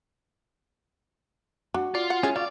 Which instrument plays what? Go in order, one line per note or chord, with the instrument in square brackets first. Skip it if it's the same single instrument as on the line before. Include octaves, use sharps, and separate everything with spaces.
[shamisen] D4 [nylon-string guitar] F#4
[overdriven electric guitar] F4 [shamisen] D5
[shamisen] F#5
[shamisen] G#3 E4 G#4 [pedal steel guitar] C#4
[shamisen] F#3 [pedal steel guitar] F4 F5 [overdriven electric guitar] D5